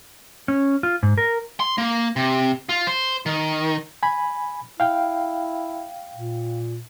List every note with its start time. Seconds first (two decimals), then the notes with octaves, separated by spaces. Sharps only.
0.48 C#4
0.83 F4
1.03 G#2
1.18 A#4
1.60 C6
1.78 A#3
2.16 C3
2.69 F4
2.87 C5
3.26 D#3
4.03 G#5 B5
4.80 E4 F5 G5
6.15 A#2